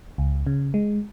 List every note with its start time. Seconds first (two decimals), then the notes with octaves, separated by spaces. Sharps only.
0.18 C#2
0.47 C#3
0.74 G#3